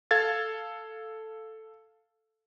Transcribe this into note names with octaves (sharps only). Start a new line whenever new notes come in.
A4 F5 G#6 A6